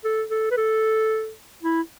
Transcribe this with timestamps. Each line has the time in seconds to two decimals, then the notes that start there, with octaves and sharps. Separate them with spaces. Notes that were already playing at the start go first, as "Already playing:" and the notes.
0.04 A4
0.30 A4
0.51 B4
0.57 A4
1.63 E4